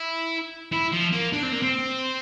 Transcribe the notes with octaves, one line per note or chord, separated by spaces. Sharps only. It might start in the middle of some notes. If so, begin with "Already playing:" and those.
Already playing: E4
E4
F3
A#3
D4
C4
A#3
C4